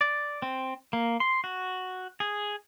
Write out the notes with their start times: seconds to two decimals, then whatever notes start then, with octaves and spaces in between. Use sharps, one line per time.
0.01 D5
0.42 C4
0.93 A#3
1.20 C6
1.44 F#4
2.20 G#4